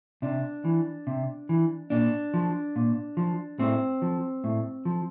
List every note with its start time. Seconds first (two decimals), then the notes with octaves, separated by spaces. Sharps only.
0.22 C3 D4
0.65 E3
1.07 C3
1.49 E3
1.90 A#2 D4
2.34 F3
2.76 A#2
3.17 F3
3.59 A2 C4
4.02 F3
4.44 A2
4.85 F3